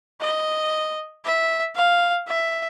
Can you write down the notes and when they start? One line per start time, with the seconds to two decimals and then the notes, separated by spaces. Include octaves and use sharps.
0.21 D#5
1.25 E5
1.76 F5
2.28 E5